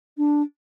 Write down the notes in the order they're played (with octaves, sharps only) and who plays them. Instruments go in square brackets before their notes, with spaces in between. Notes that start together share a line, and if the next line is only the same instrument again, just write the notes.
[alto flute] D4